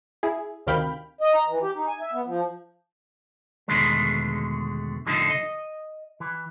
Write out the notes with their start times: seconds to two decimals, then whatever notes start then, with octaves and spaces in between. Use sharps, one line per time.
0.23 E4 G#4
0.67 D2 C3 D#3 F5 G5 B5
1.21 D#5
1.34 A#5
1.48 E3
1.62 G4
1.76 D#4
1.88 G#5
2.00 E5
2.13 B3
2.26 F3
3.68 E2 B2 D3 D#3 G#3 A3
5.06 C2 A2 D3 F3 D#4 A4
5.30 D#5
6.20 E3